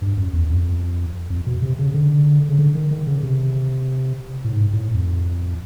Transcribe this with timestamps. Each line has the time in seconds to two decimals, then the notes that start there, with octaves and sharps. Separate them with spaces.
0.02 G2
0.17 F#2
0.33 E2
0.50 F2
1.30 F2
1.46 B2
1.62 C3
1.79 C#3
1.94 D3
2.49 C#3
2.59 D3
2.75 D#3
2.91 D#3
3.07 C#3
3.23 C3
4.44 A2
4.52 G#2
4.73 A2
4.94 F2